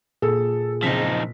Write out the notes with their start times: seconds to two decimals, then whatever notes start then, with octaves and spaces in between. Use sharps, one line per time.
0.22 A#2 G#4 A4
0.83 F#1 F3 C4 D#4 B6